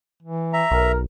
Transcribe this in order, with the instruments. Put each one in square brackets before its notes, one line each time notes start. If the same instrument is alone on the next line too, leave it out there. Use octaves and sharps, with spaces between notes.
[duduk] E3
[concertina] E5 A#5
[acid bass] B1 [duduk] A#4